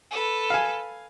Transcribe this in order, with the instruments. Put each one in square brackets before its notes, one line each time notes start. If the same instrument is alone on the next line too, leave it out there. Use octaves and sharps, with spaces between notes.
[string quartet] A4 B4
[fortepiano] F5 G#5